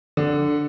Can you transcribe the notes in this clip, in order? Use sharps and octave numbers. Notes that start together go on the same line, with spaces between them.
D3